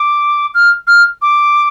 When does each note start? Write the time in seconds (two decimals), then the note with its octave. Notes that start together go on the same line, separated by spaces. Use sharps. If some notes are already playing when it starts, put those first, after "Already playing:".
Already playing: D6
0.54 F6
0.87 F6
1.22 D6